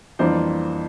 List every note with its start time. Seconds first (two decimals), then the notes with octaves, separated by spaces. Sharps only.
0.19 F2 E3 G3 A#3 D4 C5